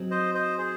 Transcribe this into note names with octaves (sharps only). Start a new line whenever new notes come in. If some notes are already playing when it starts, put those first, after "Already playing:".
Already playing: G#2 F#3 C4
C5 D#5
C5 D#5
G#4 C5